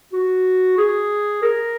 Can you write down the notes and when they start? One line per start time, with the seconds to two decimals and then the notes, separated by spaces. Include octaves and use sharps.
0.13 F#4
0.78 G#4
1.42 A#4